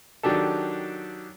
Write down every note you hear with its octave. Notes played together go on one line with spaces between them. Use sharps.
D#3 F#3 D4 G4 A4